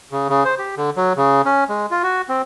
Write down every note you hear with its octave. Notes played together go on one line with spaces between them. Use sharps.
C#3
C#3
C5
G4
D3
F#3
C#3
C#4
G#3
F4
F#4
C4